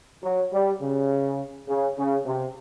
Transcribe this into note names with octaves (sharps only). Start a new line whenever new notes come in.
F#3
G3
C#3
C#3
C#3
C3